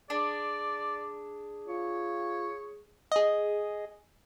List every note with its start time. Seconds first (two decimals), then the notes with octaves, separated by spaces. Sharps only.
0.10 D4 G#4 D5
1.68 F4 C#5
3.12 G#4 D#5